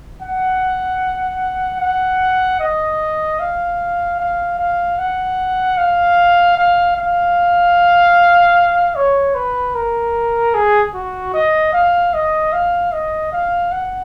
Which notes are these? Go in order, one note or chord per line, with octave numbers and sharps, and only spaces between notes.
F#5
F#5
D#5
F5
F5
F5
F#5
F5
F5
F5
C#5
B4
A#4
G#4
F#4
D#5
F5
D#5
F5
D#5
F5
F#5